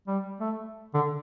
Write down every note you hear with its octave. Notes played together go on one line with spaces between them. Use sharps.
G3
A3
D3